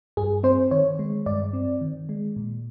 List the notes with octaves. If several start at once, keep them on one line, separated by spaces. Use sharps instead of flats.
G2 G#4
C4 C5
D#3 C#5
G#3
G2 D5
C4
D#3
G#3
A#2